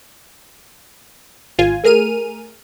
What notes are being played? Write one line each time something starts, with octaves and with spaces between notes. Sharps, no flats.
G#1 F4 G#5
A3 G#4 A#4 F6 D#7